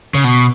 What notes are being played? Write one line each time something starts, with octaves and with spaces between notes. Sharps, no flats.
C#3
B2